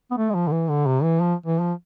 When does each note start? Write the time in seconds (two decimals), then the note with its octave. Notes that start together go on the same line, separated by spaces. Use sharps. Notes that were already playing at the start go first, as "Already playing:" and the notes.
0.11 B3
0.17 A3
0.30 G#3
0.34 F3
0.48 D3
0.52 E3
0.69 D3
0.87 C3
1.03 E3
1.21 F3
1.46 E3
1.60 F3